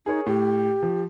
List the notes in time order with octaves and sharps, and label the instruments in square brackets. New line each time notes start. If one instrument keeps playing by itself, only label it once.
[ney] D#4 [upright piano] G#4 A#4 C#5
[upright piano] A2 [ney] G4
[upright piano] F3